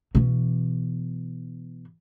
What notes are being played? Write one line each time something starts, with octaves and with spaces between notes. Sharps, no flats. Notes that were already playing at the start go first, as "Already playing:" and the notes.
B2 E3